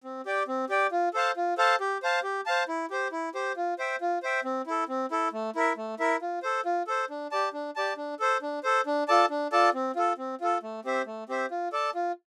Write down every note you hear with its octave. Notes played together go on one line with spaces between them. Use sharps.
C4
G4 D5 G5
C4
G4 D5 G5
F4
A4 C5 F5 A5
F4
A4 C5 F5 A5
G4
C5 F5 A5
G4
C5 F5 A5
E4
G4 C5
E4
G4 C5
F4
C5 E5 G5
F4
C5 E5 G5
C4
E4 A4
C4
E4 A4
A3
E4 A#4 E5
A3
E4 A#4 E5
F4
A4 C5
F4
A4 C5
D4
G4 D5 A5
D4
G4 D5 A5
D4
A4 C5
D4
A4 C5
D4
F4 A4 D5 A5
D4
F4 A4 D5 A5
C4
F4 A4
C4
F4 A4
A3
C4 G4 C5 E5
A3
C4 G4 C5 E5
F4
A4 D5 A5
F4